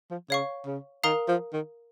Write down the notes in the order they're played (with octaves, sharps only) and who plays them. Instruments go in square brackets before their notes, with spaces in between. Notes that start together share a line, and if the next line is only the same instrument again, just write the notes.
[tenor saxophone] F3
[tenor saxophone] C#3 [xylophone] C#5 F5 C#6
[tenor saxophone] C#3
[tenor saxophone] D#3 [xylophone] A#4 F5 A#5 D#6
[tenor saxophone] F3
D#3